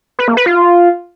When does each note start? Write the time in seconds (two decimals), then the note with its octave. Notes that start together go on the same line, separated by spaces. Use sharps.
0.19 B4
0.28 A#3
0.37 B4
0.46 F4